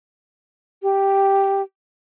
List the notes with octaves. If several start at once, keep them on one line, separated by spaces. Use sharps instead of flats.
G4